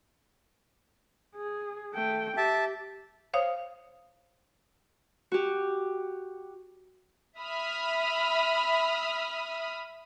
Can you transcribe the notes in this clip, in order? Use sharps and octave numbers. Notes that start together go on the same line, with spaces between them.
G#4
A3 G5
G4 E5 A5
C5 C#5 F5 D#6
F#4 G4
E5 B5 D#6 F6